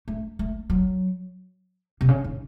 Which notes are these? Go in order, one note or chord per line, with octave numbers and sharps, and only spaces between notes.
A3
A3
F#3
C3
C#3
D#3